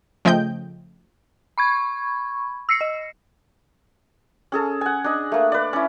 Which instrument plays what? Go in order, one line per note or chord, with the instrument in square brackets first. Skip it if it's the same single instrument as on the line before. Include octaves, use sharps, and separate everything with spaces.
[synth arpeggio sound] C#3 F3 A3 D#5 G5 G6
[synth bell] B5 C#6 G#6
E6 A#6 C7 C#7
D#5
[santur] C#4 G#4 A4
F#5 G#5
D4 D#5
A3 A#3
B4 D5
C#4 E4